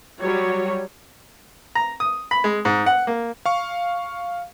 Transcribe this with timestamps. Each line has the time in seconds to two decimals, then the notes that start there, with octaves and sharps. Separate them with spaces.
0.22 F#3 G3 C#5
1.75 A#5
2.00 D#6
2.31 B5
2.44 G#3
2.65 G#2
2.86 F#5
3.07 A#3
3.46 F5 C#6